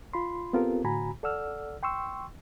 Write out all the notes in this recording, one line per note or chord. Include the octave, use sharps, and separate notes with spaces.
F4 B5 C6
B3 C4 F4 G4 A4 A#4
A2 D3 F#4 G#5 A#5 B5
A4 D5 F#5 E6 F6
G5 C6 C#6 E6